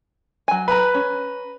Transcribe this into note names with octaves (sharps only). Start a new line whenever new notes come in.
F#3 G#5
B4 A#5
C#4